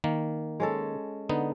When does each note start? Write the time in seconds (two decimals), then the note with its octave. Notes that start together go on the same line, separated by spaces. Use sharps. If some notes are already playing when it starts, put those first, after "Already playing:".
0.04 D#3 A#3
0.60 G#3 C#4 A4
1.29 D3 B3 D#4